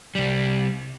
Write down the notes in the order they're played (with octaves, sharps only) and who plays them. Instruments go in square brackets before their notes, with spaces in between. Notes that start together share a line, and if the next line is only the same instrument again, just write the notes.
[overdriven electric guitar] C2 G3